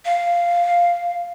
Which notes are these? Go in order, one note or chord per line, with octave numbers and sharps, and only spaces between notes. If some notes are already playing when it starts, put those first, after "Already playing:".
F5